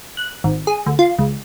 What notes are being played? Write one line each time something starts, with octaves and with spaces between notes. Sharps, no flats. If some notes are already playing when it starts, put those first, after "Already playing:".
F#6
G#1
G#4
D2
F4
C#2